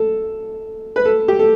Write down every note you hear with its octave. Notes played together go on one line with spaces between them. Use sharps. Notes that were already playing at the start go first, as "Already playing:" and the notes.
Already playing: A4
B4
A4
G4
A4